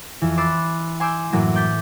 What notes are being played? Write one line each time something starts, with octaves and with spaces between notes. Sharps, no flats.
F2 E3
B5 C6 D6 E6 F#6 A6
G#5 C6 D6 E6 G6 D7
F#2 A2 E3 F#3 A#3
D6 G6 A6 B6